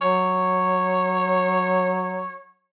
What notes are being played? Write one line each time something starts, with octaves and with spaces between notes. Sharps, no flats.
F#3 C#5